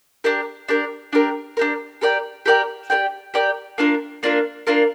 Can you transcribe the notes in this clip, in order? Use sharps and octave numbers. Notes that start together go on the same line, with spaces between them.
D4 G4 A#4
D4 G4 A#4
D4 G4 A#4
D4 G4 A#4
G4 A#4 D5 G5
G4 A#4 D5 G5
G4 A#4 D5 G5
G4 A#4 D5 G5
A#3 D4 F4 A#4
A#3 D4 F4 A#4
A#3 D4 F4 A#4